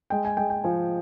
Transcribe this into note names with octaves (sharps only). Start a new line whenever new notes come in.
G#3 G5
G#5
G#3 G5
G5
F3 G#5